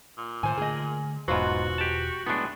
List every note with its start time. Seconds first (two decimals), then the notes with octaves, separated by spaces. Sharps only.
0.18 A#2
0.43 F#2 A2 D#3 C5 G#5
0.57 D3 A3 G#4 D#5
1.28 E1 G#2 F#3 B3 F4 F#4 C5
1.78 G4 A5
2.26 A2 F#3 G#3 B3 D4